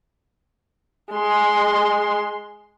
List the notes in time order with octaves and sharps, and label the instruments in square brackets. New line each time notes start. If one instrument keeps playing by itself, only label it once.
[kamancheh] G#3 C6